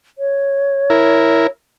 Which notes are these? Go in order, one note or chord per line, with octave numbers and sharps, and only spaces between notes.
C#5
E4 A#4